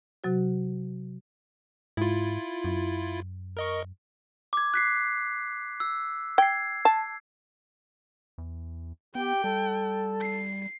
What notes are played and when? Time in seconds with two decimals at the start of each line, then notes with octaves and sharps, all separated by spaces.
0.24 C3 F#3 F#4
1.97 G#2 E4 F4
2.64 F#2
3.57 A#4 D#5 C#6
4.53 D6 G#6
4.74 F#6 B6 C7
5.80 E6
6.38 G5 G#6 C7
6.85 A5
8.38 E2
9.15 B3 G4 G5
9.44 G3 A4
10.21 C7